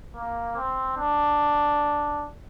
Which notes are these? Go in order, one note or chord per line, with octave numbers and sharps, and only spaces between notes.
A#3
C4
D4